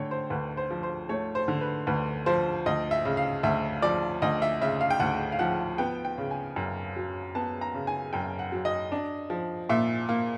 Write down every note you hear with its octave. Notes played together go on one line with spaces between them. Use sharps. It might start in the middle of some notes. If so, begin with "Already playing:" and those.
Already playing: D3 A3 C#5 G5
C5
D2 B4
C5
F3
C5
A3 C#5
C5
D3
B4
D2 B4
F3 C5
D2 D#5
E5
C#3
F5
D2 E5
F3 D5
D2 D#5
E5
C#3 E5
F5
G5
D2 F#5
F5
F3 F#5
B3 G5
G5
C#3
G#5
F#2
F#3
B3 A5
A#5
C#3
G#5
F#2 G5
F#5
F#3
D#5
D4
F3
A#2 E5
A#3